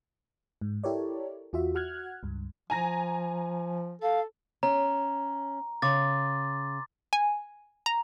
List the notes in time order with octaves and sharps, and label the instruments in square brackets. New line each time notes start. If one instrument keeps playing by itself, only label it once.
[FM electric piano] G#2
E4 G4 A4 A#4 C#5 D5
E2 F4 F#4 E5
F#4 F#5 F6 F#6 G#6
C#2 G2
[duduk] F3 [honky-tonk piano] G#5 A#5 A#6
[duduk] A4 [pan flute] F5
[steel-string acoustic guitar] C#4 [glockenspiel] A#5
[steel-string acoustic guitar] C#3 [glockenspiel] C6 D6 A6
[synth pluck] G#5
A#5